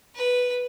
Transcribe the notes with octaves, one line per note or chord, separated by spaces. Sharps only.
B4